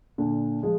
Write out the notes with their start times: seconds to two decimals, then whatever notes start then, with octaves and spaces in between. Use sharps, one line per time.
0.18 A#2 D3
0.63 F3 G#3